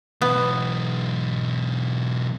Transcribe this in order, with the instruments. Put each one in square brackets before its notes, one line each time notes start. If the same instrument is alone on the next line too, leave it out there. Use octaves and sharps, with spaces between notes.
[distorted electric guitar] B1 E3 [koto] B3